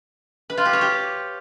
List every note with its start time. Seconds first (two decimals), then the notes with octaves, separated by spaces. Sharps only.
0.50 B4
0.57 F4
0.65 G4
0.73 C#5
0.81 G4